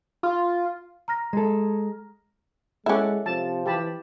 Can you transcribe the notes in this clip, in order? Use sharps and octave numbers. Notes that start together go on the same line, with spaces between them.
F4
A#5 F6 A#6
G#3 A4
G#3 C#4 E4 A4 F#5 D6
C3 F3 A5
E3 G4 A5 B5